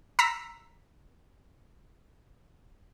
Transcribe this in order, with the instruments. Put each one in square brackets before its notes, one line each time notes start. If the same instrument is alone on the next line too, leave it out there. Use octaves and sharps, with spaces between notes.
[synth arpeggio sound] A#5 E6 B6